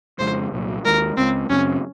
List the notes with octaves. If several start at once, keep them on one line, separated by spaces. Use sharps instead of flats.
F2 C#3 G#3 C5
C2 A#2 F#3
D#2 D#3 G#3 A#4
C#2 C#3 G#3 C4
F#2 C#3 F3 C4 C#4